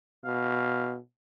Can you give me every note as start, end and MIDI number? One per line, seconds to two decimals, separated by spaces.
0.25 0.98 47
0.25 0.93 77